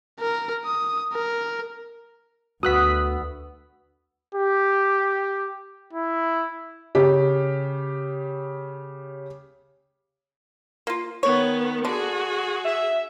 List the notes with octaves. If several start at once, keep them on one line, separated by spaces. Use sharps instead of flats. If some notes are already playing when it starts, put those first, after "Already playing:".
A#4
D#6
A#4
D2 B3 F#4 D#6 E6 F#6 B6
G4
E4
C#3 G4
A#3 F4
D#3 B3 C#5
D3 F#4 G#4
E5